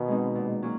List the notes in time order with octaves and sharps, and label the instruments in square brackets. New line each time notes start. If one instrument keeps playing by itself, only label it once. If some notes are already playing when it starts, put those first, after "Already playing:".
Already playing: [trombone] B2 [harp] D#3
[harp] G#3 C4 D#4
A#2
F#3 A#3 C#4